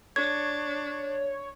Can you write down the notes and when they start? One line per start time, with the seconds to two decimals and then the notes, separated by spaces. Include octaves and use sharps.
0.16 D4 C#5 G#6